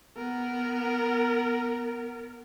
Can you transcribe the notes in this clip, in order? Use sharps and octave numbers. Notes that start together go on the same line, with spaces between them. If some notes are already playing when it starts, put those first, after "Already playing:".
B3 A#4